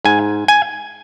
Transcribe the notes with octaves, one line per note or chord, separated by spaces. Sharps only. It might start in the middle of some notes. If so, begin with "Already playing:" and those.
G#2 G#5
G#5